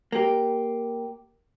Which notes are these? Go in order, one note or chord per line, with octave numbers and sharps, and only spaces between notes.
A#3 G4